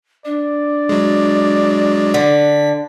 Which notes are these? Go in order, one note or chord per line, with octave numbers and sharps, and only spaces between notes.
D4 D5
F#3 G#3
D3 B6